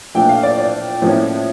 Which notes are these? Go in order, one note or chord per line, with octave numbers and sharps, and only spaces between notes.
A#2 F3 A3 D4 G5
F5
D5
D5
A2 F3 A#3 C#4